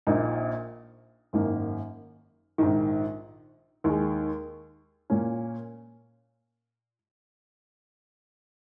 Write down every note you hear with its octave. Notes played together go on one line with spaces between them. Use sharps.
A#1 A#2 A#3 D#4
G#1 F#2 D#3 A#3
A#1 G#2 D#3
D#2 D#3 G#3
A#2 A#3 C#4